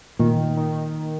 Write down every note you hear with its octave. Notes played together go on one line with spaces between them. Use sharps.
A#2 D#3
D#3